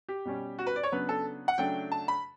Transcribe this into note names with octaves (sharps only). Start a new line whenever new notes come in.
G4
B2 G3 C#4
F#4
B4
D5
C#5
C#3 F#3 B3 D4 B4
A4
F#5
C#3 F#3 A3 D4 G5
A5
B5